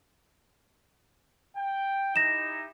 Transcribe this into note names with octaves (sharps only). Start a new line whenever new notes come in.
G5
D#4 E4 G4 A#6 E7